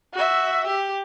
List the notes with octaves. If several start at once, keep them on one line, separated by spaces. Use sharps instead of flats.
F#4 E5
G4